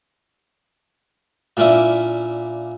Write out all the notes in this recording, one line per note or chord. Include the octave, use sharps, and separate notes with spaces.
A#2 A#3 C#4 D4 E4